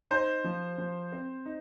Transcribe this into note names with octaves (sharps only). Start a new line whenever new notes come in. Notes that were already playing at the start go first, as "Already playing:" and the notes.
D#4 C5
F3
F3
C4
D#4